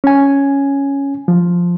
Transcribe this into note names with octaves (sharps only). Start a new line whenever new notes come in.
C#4 G#5
F3